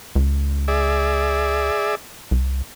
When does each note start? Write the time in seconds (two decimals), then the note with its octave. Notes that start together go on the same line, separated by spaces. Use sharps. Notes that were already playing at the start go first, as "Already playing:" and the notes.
0.15 C#2
0.68 G#4 D5 E5
2.31 C2